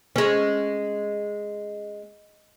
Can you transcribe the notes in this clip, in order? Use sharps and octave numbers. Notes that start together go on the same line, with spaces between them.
G#3 C#4